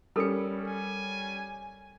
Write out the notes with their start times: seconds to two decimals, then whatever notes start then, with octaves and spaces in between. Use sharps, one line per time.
0.16 G3 C#4 A4 A#4 B5 C#7
0.68 G#5